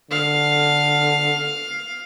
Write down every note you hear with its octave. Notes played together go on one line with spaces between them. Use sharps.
D3 F5